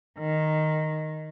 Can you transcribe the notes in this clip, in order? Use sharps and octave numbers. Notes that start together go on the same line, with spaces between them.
D#3